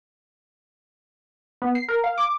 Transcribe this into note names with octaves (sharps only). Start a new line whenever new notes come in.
B3
C7
A#4
F5
D6